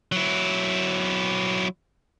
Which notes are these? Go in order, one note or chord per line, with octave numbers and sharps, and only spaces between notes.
F#3 E4